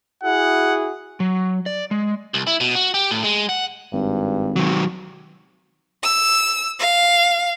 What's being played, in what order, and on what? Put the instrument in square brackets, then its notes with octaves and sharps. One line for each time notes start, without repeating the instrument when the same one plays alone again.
[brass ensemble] E4 F#4 G#4 [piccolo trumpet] F#5
[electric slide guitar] F#3
D5
G#3
[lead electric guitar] C2
E4
B2
F#4
G4
A2
G#3
F#5
[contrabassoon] G#1 [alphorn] G2
[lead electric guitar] D#3 F#3
[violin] E6
F5